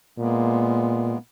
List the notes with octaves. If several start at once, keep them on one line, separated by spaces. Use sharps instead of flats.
A#2 G#3 A#3 B3